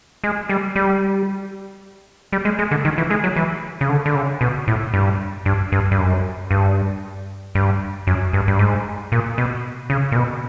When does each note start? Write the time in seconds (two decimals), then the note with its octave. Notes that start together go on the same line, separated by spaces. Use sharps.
0.24 G#3
0.49 G3
0.76 G3
2.33 G3
2.45 G#3
2.59 G#3
2.71 D3
2.85 D#3
2.98 E3
3.10 G#3
3.24 F#3
3.36 E3
3.81 C#3
3.89 D3
4.06 D3
4.15 C#3
4.41 B2
4.67 A2
4.94 G2
5.45 G2
5.72 G2
5.91 G2
5.98 F#2
6.51 G2
7.55 G2
8.07 F#2
8.33 G2
8.48 G2
8.59 G#2
9.12 A#2
9.38 B2
9.90 C#3
10.12 A#2
10.16 B2